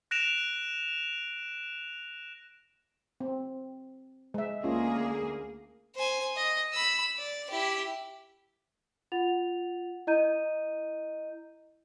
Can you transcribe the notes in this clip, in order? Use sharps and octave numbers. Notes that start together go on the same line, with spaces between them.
F#6 A#6 D7 E7 F7
C4
G#3 E5
D2 A#3 C#4 F4 G#4
C5 G#5
D#5
B5 E6
D5
E4 G4
F4 F#5 A6 F7
E4 D#5 A#5 G6 D#7